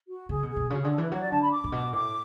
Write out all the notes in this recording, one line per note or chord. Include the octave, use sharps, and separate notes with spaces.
F#4
C#3 G#4
B2
G#4
B2
C#3 F#4
D3 G#4
A4
E3 B4
F#3 C#5
D5
D3 A5
B5
D6
A2
B2 D6
A2 D6